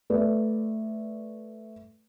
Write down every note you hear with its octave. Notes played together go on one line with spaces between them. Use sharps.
A3 B4 D5